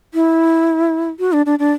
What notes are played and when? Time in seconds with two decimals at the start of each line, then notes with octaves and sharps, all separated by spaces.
0.14 E4
1.19 F#4
1.33 D4
1.46 D4
1.59 D4